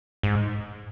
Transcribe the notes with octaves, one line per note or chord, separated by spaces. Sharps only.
G#2